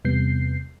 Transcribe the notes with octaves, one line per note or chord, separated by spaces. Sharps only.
E2 C3 G3 B3 G6 C7